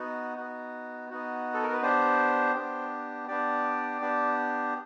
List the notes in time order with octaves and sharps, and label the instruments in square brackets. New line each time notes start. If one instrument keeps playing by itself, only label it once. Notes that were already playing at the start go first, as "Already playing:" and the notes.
Already playing: [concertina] B3 D#4 F#4
B3 D#4 F#4
B3 D#4 F#4
A4
A#4
B4
B3 D4 G4 C5
B3 D4 G4
B3 D4 G4 D5
B3 D4 G4